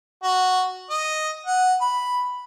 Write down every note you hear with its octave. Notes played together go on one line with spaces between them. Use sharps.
F#4
D#5
F#5
B5